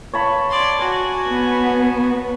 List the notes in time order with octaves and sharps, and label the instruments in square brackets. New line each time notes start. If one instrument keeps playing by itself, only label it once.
[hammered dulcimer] C#5 A5 B5
[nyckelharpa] D5 C6
F#4 G#5
[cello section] B3